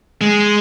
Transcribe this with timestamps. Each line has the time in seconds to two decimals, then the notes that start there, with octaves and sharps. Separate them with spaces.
0.21 G#3